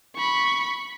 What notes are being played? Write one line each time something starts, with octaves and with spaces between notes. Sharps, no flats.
B5 C#6